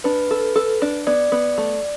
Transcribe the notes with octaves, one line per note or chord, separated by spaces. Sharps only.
D4 B4
A4
A4
D4
B3 D5
B3
A3